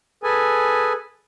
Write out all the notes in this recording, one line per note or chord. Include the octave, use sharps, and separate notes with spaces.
G#4 A4 B4 G#5